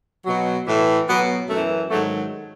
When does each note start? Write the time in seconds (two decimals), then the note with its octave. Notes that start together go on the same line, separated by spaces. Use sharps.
0.26 B2 F#3
0.67 A2 E3
1.08 B2 F#3 B3
1.49 F#2 E3 A3
1.90 G#2 D#3 F#3 A3